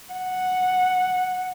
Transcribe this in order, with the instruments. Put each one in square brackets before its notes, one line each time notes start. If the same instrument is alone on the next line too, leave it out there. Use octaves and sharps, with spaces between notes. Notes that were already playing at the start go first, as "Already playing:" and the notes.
[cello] F#5